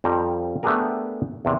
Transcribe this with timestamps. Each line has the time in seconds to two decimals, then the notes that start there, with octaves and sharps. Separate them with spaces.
0.04 F2 G3 G5 A#5
0.63 A3 B3 D4 G4 G#4 A#4
1.45 E2 C3